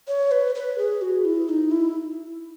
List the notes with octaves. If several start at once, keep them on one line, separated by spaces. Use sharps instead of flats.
C#5
B4
B4
G#4
F#4
E4
D#4
E4